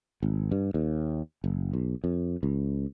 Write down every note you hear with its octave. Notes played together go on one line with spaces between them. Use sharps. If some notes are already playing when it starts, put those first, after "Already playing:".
G#1
G2
D#2
F#1
B1
F2
C#2